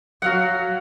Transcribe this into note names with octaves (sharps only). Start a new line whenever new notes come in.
F#3 F#4 F5 F#5